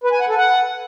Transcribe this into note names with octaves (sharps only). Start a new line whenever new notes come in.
B4
G#5
F#5
A4
F#5